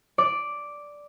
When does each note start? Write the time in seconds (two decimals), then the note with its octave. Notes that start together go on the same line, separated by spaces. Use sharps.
0.18 D5